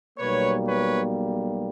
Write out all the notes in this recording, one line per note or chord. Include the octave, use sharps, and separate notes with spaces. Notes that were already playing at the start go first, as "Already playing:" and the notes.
B1 B2 G3 A#3 B4 C#5
B4 C#5